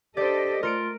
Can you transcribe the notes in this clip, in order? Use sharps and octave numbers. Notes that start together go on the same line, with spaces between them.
D4 G4 A4 C5 D5 D#5
A3 F4 A#4 C#7 D7